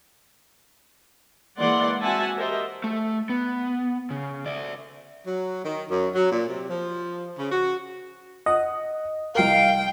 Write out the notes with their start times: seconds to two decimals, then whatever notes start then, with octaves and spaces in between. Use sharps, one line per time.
1.58 E3 G#3 A#3 D5 F#5 C6
2.01 C4 F#4 E5 F#5 G#5 A5
2.36 G4 A#4 C5 D#5 E5
2.84 A3 A4
3.30 B3
4.11 C#3
4.46 D5 E5
5.26 F#3
5.64 D#3
5.90 F#2
6.15 F#3
6.31 A#2
6.49 C3
6.69 F3
7.38 C#3
7.51 F#4
8.46 D#5 F#5 D#6
9.35 C2 A#4 F5 G5